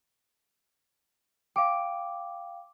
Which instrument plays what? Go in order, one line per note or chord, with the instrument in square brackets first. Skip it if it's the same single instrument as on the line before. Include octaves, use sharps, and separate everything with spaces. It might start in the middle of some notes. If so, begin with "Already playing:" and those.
[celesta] F5 G5 [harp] D6